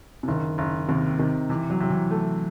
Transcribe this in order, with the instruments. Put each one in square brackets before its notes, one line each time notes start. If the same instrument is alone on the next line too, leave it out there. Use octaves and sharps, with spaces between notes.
[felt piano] C3
[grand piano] F#1 [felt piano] D#3
[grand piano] F#1
[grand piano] D#2 [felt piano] C3
[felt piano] C3 [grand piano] D#3
[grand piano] C3 [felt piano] E3
[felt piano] F#3
[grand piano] C3 [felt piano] F#3
[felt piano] E3
[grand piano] A3